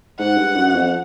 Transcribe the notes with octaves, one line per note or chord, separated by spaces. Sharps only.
G#2 F#5
G2
F#2
F2